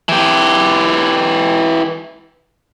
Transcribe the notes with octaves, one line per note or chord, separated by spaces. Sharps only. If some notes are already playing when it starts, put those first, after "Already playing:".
E3 G4